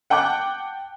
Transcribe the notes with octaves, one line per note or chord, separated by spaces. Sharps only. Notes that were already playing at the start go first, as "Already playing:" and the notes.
F#5 G5 A5 D6 F#6